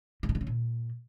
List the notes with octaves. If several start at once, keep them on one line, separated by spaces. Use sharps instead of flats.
C#3
B2
D3
C#3
A#2